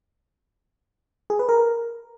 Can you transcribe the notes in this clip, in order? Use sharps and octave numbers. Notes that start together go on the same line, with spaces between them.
G#4
B4
A#4